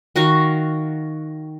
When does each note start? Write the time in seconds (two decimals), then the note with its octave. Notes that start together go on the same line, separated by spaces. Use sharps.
0.16 D#3 F#4 F5 C#6